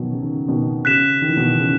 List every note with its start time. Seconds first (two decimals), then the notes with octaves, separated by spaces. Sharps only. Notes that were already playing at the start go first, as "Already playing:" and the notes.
Already playing: B2 D#3 F#3
0.12 C#3
0.22 D#3
0.33 C#3
0.48 B2 D#3
0.85 C#3 F#6 B6 E7
1.22 D#3
1.29 E3
1.37 B2 D#3
1.59 C#3